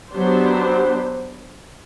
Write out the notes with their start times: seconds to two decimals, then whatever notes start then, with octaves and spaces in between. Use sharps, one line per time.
0.11 F#3 B3 D4 G4 C5